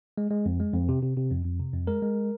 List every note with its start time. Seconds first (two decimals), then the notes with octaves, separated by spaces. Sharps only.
0.18 G#3
0.31 G#3
0.46 F2
0.60 G#3
0.73 F2
0.89 C3
1.02 C3
1.17 C3
1.31 F2
1.45 F2
1.59 C3
1.74 F2
1.87 G#3 A#4
2.02 G#3